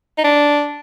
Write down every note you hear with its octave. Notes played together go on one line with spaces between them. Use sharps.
D#4
D4